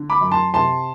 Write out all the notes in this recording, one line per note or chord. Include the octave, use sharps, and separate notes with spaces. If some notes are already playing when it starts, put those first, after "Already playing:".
Already playing: D3
B5 D6
F#2
A5 C6
C3 A5 C6